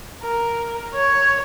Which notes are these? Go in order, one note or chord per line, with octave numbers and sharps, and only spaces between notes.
A#4
C#5